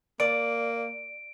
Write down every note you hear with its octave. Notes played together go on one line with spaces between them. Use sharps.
A#3 D5 D7